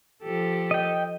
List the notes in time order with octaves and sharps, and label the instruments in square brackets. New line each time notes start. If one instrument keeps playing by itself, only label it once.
[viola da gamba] F3 G4 A4
[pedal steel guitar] D#5 G5